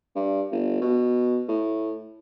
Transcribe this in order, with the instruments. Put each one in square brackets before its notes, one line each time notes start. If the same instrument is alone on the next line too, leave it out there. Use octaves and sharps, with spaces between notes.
[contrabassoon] G2
G1
B2
A2